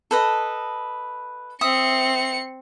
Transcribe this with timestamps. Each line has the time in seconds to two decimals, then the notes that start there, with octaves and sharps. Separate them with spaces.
0.11 A4 B4 D#5
1.61 C4 E5 D#6 C#7